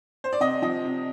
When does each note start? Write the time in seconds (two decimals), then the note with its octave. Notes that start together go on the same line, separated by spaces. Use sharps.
0.24 C5
0.33 D5
0.40 C3 D#5
0.62 F3 D#5
0.85 C3